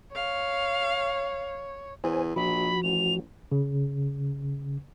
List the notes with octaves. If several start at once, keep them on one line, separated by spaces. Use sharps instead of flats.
C#5 F5
E2 C5 G#5
A#1 F3 F#4 B5
A1 F7
C#3